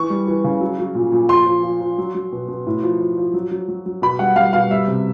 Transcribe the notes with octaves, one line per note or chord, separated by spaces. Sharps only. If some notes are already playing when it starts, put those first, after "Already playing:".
Already playing: E3 C#6
G3
E3
C#3
F#3
F#3
A#2
A#2
F3 C6
F3
F3
F3
F#3
F#3
B2
B2
A2
F3
F3
F3
F#3
F#3
F#3
F#3
B2 B5
G3 F#5
G3 F5
B2 F5
G3 E5
C3